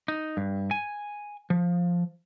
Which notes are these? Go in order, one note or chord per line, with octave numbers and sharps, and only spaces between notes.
D#4
G2
G#5
F3